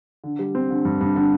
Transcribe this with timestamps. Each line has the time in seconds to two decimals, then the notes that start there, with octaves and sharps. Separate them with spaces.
0.24 D3
0.39 G3
0.55 C4
0.70 D3
0.85 G2
1.01 G2
1.16 D3